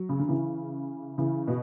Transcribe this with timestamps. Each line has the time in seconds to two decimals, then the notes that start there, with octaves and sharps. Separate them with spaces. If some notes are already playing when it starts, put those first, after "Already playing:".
Already playing: F#3
0.09 C#3
0.19 D3
0.29 C#3 E3
1.18 C#3 E3
1.48 B2